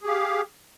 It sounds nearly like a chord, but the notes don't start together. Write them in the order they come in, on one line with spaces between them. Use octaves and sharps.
G#4 G4 F5